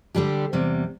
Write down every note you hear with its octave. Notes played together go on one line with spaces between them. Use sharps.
D3 G3 D4 G4
E2 C3 G3